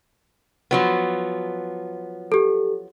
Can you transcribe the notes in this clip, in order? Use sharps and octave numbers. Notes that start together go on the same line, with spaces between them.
F3 F#3 B3
G4 A4